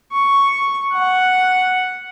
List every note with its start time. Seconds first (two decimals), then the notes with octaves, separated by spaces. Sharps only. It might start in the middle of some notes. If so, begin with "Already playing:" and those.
0.12 C#6
0.93 F#5